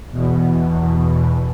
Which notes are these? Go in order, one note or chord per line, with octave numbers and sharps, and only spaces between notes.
E2 B2